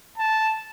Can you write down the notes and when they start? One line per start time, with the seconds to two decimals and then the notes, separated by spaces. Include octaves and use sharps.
0.17 A5